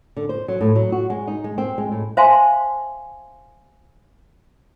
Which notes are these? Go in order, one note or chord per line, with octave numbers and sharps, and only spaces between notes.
D3
C5
F#3
A2
F#3
F#4
G#3
D#4
G#3
C4
G#3
A2
C5 E5 F5 G#5 A5 C6